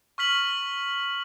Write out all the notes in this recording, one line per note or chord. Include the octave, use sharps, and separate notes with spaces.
C#6 F6 B6 F#7